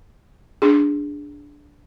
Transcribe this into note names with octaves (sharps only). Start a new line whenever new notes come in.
D4 G#4